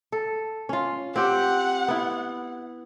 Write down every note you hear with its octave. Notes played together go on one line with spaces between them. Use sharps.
A4
C#4 F4
C4 G4 F#5
B3 E4